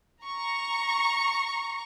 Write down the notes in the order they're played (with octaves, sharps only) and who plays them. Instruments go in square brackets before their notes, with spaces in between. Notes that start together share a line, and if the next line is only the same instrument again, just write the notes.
[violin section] A#5 C#6